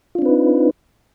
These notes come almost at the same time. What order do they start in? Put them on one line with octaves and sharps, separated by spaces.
F4 D4 C4 B4 D#4